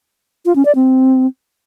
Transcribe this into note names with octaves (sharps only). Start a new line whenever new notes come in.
F4
C#4
D5
C4